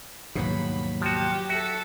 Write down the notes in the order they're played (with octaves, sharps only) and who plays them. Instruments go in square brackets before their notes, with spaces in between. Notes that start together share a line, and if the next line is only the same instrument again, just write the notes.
[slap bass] D#2 G#2 B2 [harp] F#3 [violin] B5
[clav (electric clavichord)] F3 F#4 [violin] G4
[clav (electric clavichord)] F#4 [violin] A4 E5